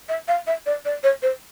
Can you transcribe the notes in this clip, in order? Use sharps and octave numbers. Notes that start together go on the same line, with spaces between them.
E5
F5
E5
D5
D5
C#5
C5